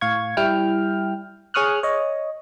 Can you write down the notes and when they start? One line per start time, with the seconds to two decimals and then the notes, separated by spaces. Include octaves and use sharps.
0.01 A2 F5 C#6 G#6
0.37 G3 E4 G5 F6
1.54 G#4 C#5 C#6 D#6 F6 F#6
1.83 C#5 D#5